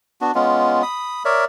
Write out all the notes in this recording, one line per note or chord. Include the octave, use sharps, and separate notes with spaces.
B3 D4 F#4
G#3 B3 C#4 F4
B5 D#6
A#4 C#5 D5 E5